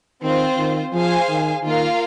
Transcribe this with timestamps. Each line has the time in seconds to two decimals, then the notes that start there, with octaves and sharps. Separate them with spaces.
0.23 D#3 C4 F4 C5
0.58 D#3
0.93 F3 G#4 C5 F5 G#5
1.29 D#3
1.63 D#3 A#3 F4 A#4 F5